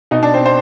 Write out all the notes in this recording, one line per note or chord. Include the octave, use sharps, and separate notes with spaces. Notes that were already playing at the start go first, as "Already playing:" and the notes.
B2 D#4 D#5
D4 D5
C4 C5
C5